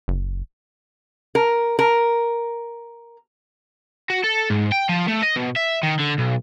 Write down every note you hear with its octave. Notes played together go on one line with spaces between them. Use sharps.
F#1
A#4
A#4
F#4
A4
G#2
G5
F3
A3
D#5
B2
E5
D#3
D3
B1